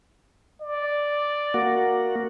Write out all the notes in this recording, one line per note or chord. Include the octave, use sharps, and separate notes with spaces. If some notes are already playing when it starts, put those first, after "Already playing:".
D5
A#3 F#4